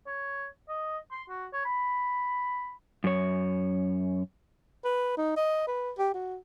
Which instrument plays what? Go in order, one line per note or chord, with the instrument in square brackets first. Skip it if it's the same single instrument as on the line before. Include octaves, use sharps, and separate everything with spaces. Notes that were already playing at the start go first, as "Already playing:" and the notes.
[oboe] C#5
D#5
C6
F#4
C#5
B5
[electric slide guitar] F#2 C#5
[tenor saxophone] B4
D#4
D#5
B4
G4
F#4